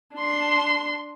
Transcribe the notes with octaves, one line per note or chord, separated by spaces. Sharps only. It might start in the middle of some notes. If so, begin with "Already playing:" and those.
D4 C6